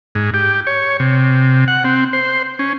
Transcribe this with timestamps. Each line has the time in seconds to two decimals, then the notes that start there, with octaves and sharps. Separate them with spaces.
0.15 G#2
0.34 G4
0.67 C#5
1.00 C3
1.68 F#5
1.84 C4
2.13 C5
2.59 C#4